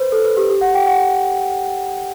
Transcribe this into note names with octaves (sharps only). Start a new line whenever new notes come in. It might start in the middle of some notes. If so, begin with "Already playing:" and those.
Already playing: B4 C5
A4
B4
G4
G4
F#5
G5
F#5